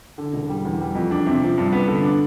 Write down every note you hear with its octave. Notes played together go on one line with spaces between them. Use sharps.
D3
E1
G3
E2
G3
F2
D4
C3
F3
G2
B3
D3
D4